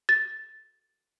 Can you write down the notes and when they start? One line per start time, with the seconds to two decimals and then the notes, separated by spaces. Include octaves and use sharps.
0.09 A6